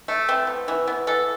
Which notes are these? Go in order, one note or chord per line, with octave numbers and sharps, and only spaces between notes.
A3
E3 C4
B3
E3
B3
E3 A4